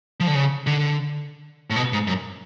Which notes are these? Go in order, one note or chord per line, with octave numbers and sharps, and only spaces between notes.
F3
D3
C#3
D3
A2
B2
G#2
F#2